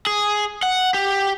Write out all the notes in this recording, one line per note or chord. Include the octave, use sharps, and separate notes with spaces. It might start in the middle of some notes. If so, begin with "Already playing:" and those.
G#4
F#5
G4